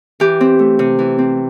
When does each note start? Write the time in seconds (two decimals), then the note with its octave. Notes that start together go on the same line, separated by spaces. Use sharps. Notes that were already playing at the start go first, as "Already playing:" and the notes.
0.20 E3 G4
0.41 C4
0.59 A3
0.79 C3
0.99 E3
1.19 C4